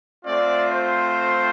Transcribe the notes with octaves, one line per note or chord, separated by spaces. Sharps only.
A3 C4 F4 D5
C5